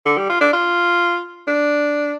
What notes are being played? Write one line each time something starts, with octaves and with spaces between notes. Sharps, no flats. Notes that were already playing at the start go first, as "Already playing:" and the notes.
D3
G3
F4
D4
F4
D4